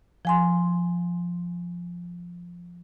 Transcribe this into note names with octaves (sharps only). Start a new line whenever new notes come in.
F3 G#5 C6